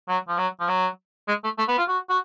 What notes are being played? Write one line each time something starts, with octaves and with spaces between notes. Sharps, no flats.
F#3
F3
F#3
F3
F#3
G#3
A3
A3
B3
F4
F#4
F#4